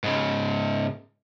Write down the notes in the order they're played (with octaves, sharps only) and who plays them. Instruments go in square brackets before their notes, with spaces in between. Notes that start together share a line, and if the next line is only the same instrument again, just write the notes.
[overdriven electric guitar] G#2 C#3